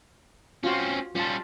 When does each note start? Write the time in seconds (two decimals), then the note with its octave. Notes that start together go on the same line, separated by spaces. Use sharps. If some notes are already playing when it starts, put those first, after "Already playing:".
0.64 C4 C#4 F4 F#4
1.15 G3 C#4 F4 A5